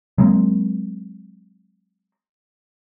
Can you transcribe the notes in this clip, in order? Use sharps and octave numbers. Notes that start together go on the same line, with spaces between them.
F#3 G#3 A#3 C4